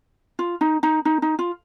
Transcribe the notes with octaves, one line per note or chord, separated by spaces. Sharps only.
F4
D#4
D#4
D#4
D#4
F4